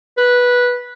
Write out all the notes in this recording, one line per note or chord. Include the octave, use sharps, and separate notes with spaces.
B4